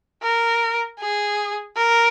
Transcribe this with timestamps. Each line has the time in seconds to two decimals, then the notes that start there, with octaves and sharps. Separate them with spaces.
0.23 A#4
1.00 G#4
1.76 A#4